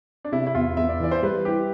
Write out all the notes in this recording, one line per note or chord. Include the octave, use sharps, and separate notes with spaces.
D4
C3 E4
E4
E2 F4
E2 E5
D5
E3 D5
C5
G3 B4
E4 G4